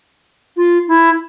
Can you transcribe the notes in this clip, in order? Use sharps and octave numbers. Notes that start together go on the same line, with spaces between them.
F4
E4